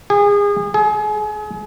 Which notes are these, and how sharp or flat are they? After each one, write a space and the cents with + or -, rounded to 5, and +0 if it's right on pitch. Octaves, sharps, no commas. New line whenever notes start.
G#4 -30
G#4 +35